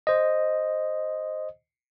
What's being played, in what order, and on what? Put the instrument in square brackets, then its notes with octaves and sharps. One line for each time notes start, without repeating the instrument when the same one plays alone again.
[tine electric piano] C5 D#5